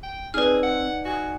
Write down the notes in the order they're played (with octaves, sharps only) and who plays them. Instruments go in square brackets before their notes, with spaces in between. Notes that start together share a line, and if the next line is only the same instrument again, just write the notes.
[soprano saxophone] G5
[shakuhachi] C4 [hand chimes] D#4 D5 [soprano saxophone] G#4 [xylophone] B4 F6
[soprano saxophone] F#5
[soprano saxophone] F#4 [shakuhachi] G#5